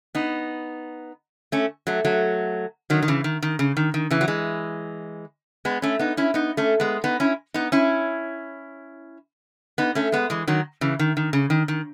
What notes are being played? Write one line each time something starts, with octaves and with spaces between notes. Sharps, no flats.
B3 D#4
A3 C#4
F#3 A3
F#3 A3
D#3 F#3
D#3
C#3 E3
D#3
D#3
C#3
D#3
D#3
C#3 E3
F#3
E3 G#3
G#3 B3
A3 C#4
B3 D#4
C#4 E4
B3 D#4
A3 C#4
G#3 B3
B3 D#4
C#4 E4
B3 D#4
C#4 E4
B3 D#4
A3 C#4
G#3 B3
E3 G#3
D#3 F#3
C#3 E3
D#3
D#3
C#3
D#3
D#3